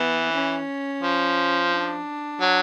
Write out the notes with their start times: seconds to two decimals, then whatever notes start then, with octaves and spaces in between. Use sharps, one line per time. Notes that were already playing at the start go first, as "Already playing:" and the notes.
Already playing: E3 B3
0.33 C#4
1.03 F3
1.71 D4
2.41 F#3